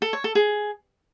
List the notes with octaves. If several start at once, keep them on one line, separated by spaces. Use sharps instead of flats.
A4
C#5
A4
G#4